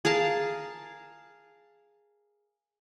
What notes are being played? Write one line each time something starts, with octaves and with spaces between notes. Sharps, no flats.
G#4 A#4 F5 A5